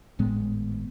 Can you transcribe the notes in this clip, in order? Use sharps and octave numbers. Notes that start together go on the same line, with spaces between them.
G#1 A2 G#3 B3